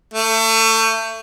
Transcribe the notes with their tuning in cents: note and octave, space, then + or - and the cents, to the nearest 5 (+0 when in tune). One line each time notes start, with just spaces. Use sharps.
A3 +30